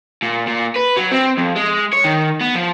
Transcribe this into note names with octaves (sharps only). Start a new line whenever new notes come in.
A#2
A#2
B4
F#3
C4
F2
G#3
C#5
D#3
B3
F3